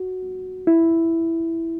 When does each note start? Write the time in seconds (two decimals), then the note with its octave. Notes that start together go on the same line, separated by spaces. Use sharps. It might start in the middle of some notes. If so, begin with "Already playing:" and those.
Already playing: F#4
0.67 E4